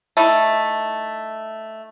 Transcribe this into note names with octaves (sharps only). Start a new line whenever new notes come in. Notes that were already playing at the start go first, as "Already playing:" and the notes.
A3 D#4 E4